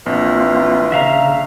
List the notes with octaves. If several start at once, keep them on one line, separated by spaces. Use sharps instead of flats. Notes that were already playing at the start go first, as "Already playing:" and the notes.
A#1 E3 A#3 C4 F4
C#3 E5 F5 A#5